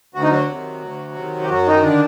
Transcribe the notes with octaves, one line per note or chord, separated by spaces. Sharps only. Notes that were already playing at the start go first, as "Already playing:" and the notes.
D2 F#4
D#4
F#3 F#4
C3 D#3
D2
C3 D#3
G4
F#2 F#3 F#4
D#3 D#4
D3 D#3 D4